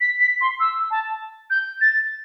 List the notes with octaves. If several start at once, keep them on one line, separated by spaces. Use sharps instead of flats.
B6
B6
C6
E6
A5
G6
A6